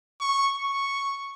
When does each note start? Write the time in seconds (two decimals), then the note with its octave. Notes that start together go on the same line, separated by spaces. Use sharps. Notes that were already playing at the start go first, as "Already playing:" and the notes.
0.21 C#6
0.54 C#6